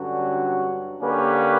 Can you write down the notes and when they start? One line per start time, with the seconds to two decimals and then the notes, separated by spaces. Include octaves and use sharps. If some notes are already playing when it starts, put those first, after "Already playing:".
Already playing: G2 D3 F#3 C#4 F#4
1.00 D3 A#3 C#4 G4 B4